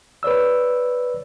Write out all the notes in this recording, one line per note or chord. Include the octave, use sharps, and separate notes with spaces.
B4 C#5 D5 E6